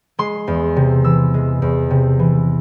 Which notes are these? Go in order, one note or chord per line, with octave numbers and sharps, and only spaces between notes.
G#3 C6
E2
C3
E3 E6
G#3
E2
C3
E3